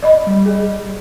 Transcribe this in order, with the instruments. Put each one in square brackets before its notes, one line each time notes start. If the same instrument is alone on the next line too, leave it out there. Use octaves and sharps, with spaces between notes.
[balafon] D5 D#5 B5
[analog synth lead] G3
[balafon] G#4